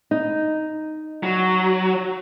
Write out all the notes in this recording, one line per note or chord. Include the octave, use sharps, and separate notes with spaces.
D#4
F#3